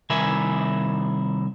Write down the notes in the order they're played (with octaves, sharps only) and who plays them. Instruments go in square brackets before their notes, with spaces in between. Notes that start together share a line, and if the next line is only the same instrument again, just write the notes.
[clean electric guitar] C2 D#3 E4 A#4 E5 G#5